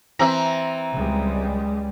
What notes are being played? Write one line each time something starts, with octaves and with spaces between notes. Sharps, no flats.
E3 C4 E5 A#5
C#2 G3 G#3